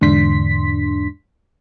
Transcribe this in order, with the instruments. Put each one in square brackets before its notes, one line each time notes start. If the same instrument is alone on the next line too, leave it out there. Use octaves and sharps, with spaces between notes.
[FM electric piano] E2 G#2 D3 D4 C6 B6